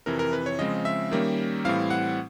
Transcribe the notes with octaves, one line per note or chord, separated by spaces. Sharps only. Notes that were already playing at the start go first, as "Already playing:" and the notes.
F2 C3 E3 A#4
A#4
B4
C#5
C#3 F3 G#3 C4 D#5
E5
D#3 G3 A#3 C#4
A2 E3 G3 C4 E4 F5
F#5